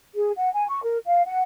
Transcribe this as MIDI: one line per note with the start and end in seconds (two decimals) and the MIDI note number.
0.15 0.31 68
0.37 0.48 78
0.54 0.65 80
0.67 0.82 85
0.83 0.97 70
1.06 1.22 77
1.25 1.43 78